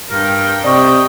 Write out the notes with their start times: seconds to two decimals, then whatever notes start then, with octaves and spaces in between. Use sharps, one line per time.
0.10 G2 A#4 G5
0.64 C3 D5 D#5 G5 C#6